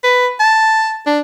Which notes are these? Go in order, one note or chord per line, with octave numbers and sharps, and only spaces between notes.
B4
A5
D4